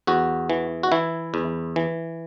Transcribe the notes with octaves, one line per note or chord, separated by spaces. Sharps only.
E2 F#4
E3
F#4
E3 E4
E2
E3